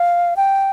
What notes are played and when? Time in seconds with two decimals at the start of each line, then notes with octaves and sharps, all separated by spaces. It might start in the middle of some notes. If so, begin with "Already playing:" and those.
Already playing: F5
0.37 G5